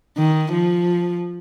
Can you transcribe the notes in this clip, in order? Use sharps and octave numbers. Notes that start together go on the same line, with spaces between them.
D#3
F3